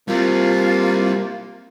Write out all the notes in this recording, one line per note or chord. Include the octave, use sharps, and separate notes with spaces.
G3 A#3 C4 F4